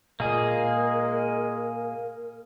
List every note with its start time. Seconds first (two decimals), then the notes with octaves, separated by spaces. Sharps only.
0.20 A#2 G#3 A#3 G#4 A#4